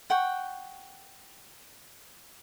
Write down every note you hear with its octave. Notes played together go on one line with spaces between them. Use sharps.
F#5 G5 C#6